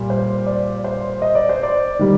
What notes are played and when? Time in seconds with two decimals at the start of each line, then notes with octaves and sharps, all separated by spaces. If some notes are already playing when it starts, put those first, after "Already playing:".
Already playing: A#2 G3
0.10 C5
0.46 D5
0.84 C5
1.22 D#5
1.35 D5
1.49 C5
1.63 D5
1.99 D#3 G3